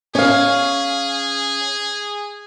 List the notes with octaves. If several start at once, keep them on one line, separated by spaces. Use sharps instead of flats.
C#4 G#4 F5